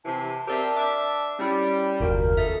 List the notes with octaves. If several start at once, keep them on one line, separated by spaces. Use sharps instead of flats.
C3 E3 A5
C4 G4 A#4 D5 E5
D4 E5 D6
G3 C#4 E4
F#1 D#2 F4 F#4 A#4
B2 D#4 A4 E5